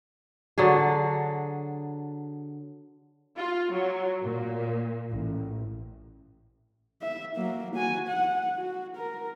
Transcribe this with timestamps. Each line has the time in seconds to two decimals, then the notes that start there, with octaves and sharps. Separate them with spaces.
0.58 D3 F#3 D4 G#4
3.37 F4
3.74 F#3
4.22 A#2
5.10 A1
7.02 E5
7.37 F#3 A#3
7.76 F#4 G#5
8.08 F#5
8.56 F#4
8.96 A#4